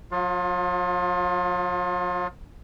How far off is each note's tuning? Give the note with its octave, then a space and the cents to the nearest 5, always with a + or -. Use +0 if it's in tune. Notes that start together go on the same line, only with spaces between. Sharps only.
F#3 -40 F4 +25